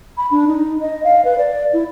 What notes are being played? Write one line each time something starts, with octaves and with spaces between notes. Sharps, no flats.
B5
D4
D#4
D#5
F5
B4
D5
E4